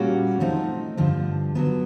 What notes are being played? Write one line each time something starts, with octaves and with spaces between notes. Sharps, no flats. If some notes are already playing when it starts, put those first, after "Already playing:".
Already playing: A#2 G3 A#3 C#4 F#4
F3 A3 C4 D#4
G2 D3 F3
D3 F#3 B3